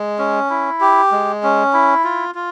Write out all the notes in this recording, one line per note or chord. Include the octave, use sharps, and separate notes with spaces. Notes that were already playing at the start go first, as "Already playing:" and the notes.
Already playing: G#3
C#4
E4
G4
G#3
C#4
E4
F4
F4